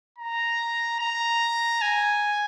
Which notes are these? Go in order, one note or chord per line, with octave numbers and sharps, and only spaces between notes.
A#5
A#5
G#5